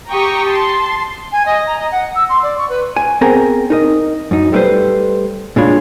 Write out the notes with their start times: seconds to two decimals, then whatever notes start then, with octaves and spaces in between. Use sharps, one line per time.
0.11 G4 G5 A#5 C#6 D#6
0.49 A5 C6
1.32 G#5
1.46 D#5
1.67 A#5
1.79 D#5
1.92 F#5
2.15 E6
2.29 C6
2.43 D5
2.58 C#6
2.69 B4
2.96 G#5
3.21 B3 C4 G#4 A#4 G#5 A#5
3.70 D#4 A#4 D#5
4.31 F#2 D#4
4.52 G3 A3 E4 F4 B4 C5
5.56 A#2 G#3 D4 F4 C#5 B5